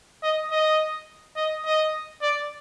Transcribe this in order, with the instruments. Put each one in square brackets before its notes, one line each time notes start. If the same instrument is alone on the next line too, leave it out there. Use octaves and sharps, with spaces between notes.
[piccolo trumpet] D#5
D#5
D#5
D#5
D5